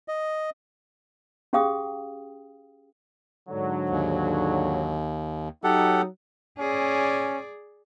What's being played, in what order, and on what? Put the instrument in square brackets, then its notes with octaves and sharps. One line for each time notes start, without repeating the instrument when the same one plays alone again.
[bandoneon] D#5
[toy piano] C#4 G4 G#4 F5 G5 D#6
[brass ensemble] G#2 D3 F#3
[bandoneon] D#2
[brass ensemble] F#3 D#4 [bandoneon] G4 A4 F#5
[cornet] C#4 [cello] G#4 D5